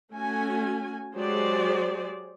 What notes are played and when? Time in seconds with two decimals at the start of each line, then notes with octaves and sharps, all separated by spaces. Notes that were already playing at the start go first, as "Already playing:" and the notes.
0.13 A3 C#4 F#4 G#5
1.15 F#3 G#3 G4 G#4 C5 D5